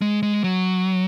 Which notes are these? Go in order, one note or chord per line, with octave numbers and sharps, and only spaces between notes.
G#3
G#3
F#3